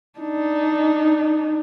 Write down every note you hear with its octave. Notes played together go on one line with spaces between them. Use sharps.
D4 D#4